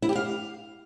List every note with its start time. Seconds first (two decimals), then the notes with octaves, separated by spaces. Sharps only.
0.02 E4
0.09 G4
0.15 F5